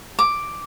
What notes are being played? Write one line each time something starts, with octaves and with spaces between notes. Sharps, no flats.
D6